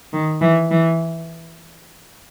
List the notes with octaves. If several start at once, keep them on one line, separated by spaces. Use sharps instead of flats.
D#3
E3
E3